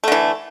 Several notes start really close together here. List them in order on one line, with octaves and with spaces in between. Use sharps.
A3 D3 E3